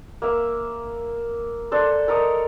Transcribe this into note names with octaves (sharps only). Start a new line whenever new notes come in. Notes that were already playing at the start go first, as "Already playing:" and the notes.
A#3 E5
D4 A4 C5
A4 A#4 C#5 D#5